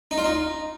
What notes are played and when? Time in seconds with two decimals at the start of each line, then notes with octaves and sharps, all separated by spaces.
0.11 D#4
0.18 F4
0.24 D#4